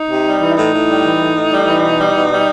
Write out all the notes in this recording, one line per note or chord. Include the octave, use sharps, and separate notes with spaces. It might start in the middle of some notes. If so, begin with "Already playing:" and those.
Already playing: D#4
C3
G3
E3
E4
A2 D#4
A2
G3
E3
A2
A2
G3
E3
B2
G3
B2
G3